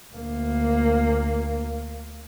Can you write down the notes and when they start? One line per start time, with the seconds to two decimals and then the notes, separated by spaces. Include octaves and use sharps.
0.13 D2 A#3